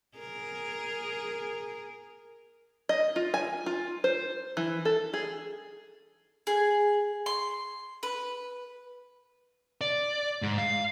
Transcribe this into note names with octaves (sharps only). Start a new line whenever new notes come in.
G#4 A#4
D#5
F4
G#5
F4
C5
E3
A4
G#4
G#4
C6
B4
D5
G#2
F5